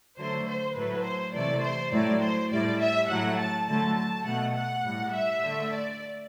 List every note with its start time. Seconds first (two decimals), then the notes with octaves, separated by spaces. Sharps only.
0.17 D3 F#3 A3 C5
0.46 C5
0.75 A2 F#3 A3 B4
1.04 C5
1.33 C3 E3 A3 D5
1.62 C5
1.92 A2 F#3 A3 D5
2.21 C5
2.51 A2 G3 D5
2.80 E5
3.08 A2 F#3 A3 F#5
3.38 A5
3.67 D3 F#3 A3 A5
3.96 A5
4.25 B2 A3 F#5
4.54 F#5
4.84 A2 G3
5.13 E5
5.42 D3 A3
5.71 D5